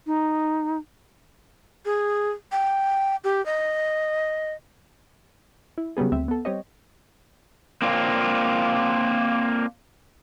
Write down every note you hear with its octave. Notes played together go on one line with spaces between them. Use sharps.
D#4
G#4
G5
G4
D#5
E4
C#3 F#3 G3 B3 G#4
D2 C4 E5
B3 A4
G3 C4 G4 C#5 D#5
A#3 C4 D4 F4